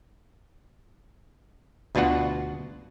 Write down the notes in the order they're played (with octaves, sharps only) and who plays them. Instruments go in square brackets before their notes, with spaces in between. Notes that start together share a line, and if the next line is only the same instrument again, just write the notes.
[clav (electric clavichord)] D2 B2 D4 F4 F#4 F#5